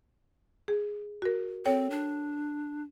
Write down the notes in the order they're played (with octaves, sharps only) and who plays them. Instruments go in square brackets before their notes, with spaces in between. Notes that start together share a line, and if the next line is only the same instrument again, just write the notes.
[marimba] G#4
F#4 A#4
[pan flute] C4 [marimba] A4 C#5 G5
[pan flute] D4